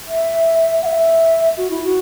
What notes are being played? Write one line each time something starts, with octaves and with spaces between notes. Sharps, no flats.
E5
F#5
E5
F#4
E4
F#4